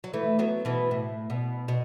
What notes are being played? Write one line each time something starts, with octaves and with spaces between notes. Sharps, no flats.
F#3
E3 A3
F#3 B3
B2 E3
A2
B2
B2